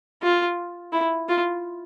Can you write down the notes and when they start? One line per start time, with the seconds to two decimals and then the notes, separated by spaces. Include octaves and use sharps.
0.23 F4
0.92 E4
1.29 F4